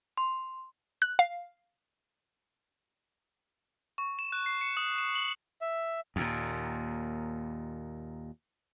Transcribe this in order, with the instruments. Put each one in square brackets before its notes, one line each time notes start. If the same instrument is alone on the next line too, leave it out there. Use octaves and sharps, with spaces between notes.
[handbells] C6
[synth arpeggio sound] F#6
F5
[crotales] C#6
E7
F#6
C7
C#7
D#6
E7
F#7
[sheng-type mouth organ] E5
[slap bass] D#2 A#2